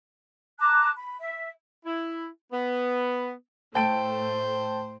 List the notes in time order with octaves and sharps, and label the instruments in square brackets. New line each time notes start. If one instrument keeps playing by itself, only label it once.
[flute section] A5 A#5 D6 F#6
B5
E5
[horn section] E4
B3
[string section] A2 A3 [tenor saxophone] C5 [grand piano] G5 A5 D7